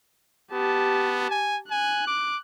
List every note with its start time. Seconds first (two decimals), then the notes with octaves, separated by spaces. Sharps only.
0.53 B3 G4 A5
1.31 G#5
1.71 G#5 F#6
2.08 D6